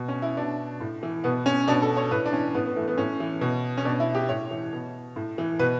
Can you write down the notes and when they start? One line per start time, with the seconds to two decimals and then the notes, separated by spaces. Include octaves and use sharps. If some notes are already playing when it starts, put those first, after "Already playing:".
Already playing: B2
0.08 C#4
0.22 E4
0.37 B2 D4
0.81 A2
1.03 E3
1.24 B2 B3
1.46 C#4
1.68 B2 D4
1.82 A4
1.97 C#5
2.11 A2 B4
2.25 D4
2.33 E3 C#4
2.55 A2 B3
2.65 B3
2.76 E3 A3
2.88 B3
2.98 A2 C#4
3.20 E3
3.41 B2
3.77 C#4
3.85 B2 D4
4.00 E4
4.15 G4
4.29 A2 C#5
4.51 E3
4.73 B2
5.16 A2
5.38 E3
5.59 B2 B4